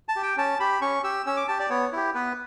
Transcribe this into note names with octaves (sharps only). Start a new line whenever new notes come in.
A5
G4
G5
C#4 A5
G4 B5
C#4 C#6
G4 E6
C#4 E6
D6
G4 A5
D5
B3 C#5
E4 G4
B3 B4